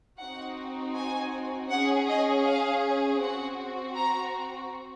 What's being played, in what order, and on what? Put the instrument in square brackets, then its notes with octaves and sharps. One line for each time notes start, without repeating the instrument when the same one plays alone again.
[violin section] C4 D#4 F#4 F#5
G#5
C#4 G#4 F#5
D#5
F5
C4 F#4 F#5
A#5